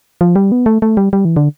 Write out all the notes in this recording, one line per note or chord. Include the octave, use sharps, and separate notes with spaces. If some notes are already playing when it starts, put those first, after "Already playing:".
F3
G3
B3
A3
A3
G3
G3
E3
D3